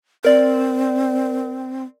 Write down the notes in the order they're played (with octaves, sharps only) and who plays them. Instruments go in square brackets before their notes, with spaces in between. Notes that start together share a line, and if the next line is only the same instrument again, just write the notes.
[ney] C4 [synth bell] A#4 D5